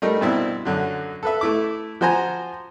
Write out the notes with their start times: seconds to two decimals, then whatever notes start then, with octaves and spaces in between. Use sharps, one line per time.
0.02 G3 A3 D#4 A#4
0.21 G2 B2 C4 D4 E4
0.65 F#2 D3 F#3
1.23 A4 B4 E5
1.41 A3 E4 D6
2.01 F3 F#4 C5 G#5 A#5